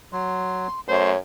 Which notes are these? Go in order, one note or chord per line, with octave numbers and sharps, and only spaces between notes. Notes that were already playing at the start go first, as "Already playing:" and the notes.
F#3 C6
F#2 A3 C5 C#5